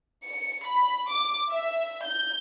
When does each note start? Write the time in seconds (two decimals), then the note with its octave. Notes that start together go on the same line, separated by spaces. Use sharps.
0.25 C#7
0.67 B5
1.12 D6
1.51 E5
2.05 G6